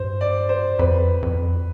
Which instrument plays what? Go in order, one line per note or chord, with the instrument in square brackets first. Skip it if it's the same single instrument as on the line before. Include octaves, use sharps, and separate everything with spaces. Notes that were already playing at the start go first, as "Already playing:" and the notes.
Already playing: [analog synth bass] G2 [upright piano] C5
[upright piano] D5
C5
[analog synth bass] F2 [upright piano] B4
[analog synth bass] F2